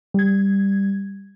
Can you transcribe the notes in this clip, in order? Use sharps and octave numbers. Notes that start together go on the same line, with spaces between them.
G3 G#6